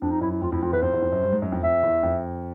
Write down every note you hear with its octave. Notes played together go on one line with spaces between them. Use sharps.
F2 D4
D#4
F#2 E4
E4
F2 F4
F2 E4
F2 F4
E2 B4
F2 C5
E2
F2
F#2
G2
G#2
F#2
F2
F2 E5
E2
F2